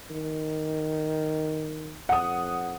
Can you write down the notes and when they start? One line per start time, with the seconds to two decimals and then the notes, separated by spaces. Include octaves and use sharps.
0.11 D#3
2.09 F2 F#5 D#6